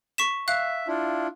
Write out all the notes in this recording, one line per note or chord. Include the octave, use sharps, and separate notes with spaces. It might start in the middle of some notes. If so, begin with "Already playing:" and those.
C#6 B6 E7
E5 F5 F#6
D4 E4 F4